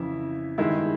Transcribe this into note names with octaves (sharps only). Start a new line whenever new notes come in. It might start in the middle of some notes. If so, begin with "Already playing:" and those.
Already playing: F2 C#3 E3 E4 E5
G2 D#3 G#3 E4 E5